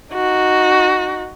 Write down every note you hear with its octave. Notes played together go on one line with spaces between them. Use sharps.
D#4 F#4